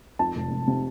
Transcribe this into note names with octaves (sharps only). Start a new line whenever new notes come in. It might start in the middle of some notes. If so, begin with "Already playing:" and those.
F2 A5
F1
F1
C3